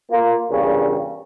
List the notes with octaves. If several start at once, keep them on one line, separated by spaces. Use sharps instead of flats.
A#3 F4
E2 G2 A#2 C#3